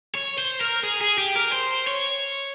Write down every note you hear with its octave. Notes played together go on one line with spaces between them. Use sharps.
C#5
C5
A#4
G#4
G#4
G4
A#4
C5
C#5